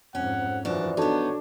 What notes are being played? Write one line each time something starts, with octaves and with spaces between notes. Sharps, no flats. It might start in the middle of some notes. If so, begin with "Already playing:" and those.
F2 G#2 C#4 F#5
F#2 E3 F3 D4 F#4
B3 D4 D#4 F#4 A4 C#5 A5